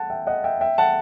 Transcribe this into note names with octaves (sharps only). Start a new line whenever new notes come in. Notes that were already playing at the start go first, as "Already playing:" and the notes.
Already playing: F#5 A5
E5 G5
D#5 F#5
E5 G5
E5 G5
F#5 A5